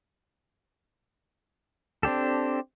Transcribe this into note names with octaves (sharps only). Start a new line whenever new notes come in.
C4 D4 G4 A4